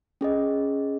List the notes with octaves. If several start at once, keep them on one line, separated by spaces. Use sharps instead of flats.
C#4 G#4 D#5